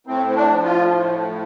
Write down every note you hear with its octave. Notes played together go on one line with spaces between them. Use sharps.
A2 C4
C4
D4
F3
F4
A2